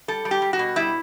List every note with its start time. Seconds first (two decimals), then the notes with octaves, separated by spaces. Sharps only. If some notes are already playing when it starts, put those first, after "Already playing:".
0.08 G3 A4
0.25 G3
0.31 G4
0.42 G3
0.53 F#4
0.59 B2
0.76 G3 E4